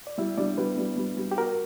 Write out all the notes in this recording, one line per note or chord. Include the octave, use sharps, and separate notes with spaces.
D5
G3 E4 E5
G3 D4 D5
G3 B3 B4
G3
G3
G3
G4
F#4 A#4